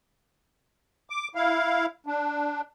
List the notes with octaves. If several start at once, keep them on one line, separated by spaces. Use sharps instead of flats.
D6
E4 F5
D4